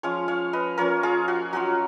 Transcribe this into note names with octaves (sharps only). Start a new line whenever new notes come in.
F3 G#3 C#4 C#5 F5
C#5 F5
B4 D#5
F3 A#3 C#4 A#4 C#5
F4 G#4
F#4
F#3 C#4 F4 F#4